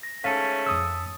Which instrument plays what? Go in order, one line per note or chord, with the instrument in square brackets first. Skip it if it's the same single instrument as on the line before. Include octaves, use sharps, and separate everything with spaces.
[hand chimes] A#6
[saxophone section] G#2 A3 C#4 [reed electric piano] F5 [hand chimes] A5 A6 B6
[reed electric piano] F2 D#6 E6